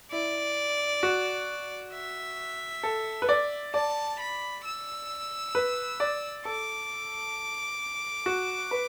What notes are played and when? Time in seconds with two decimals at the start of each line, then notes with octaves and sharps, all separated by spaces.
0.11 E4 D5
1.03 F#4
1.93 E5
2.83 A4
3.22 B4
3.29 D5
3.74 D5 A5
4.19 B5
4.65 E6
5.55 B4
6.00 D5
6.45 A4 D6
8.26 F#4
8.71 B4